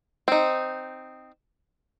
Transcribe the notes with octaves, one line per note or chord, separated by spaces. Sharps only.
C4 D#4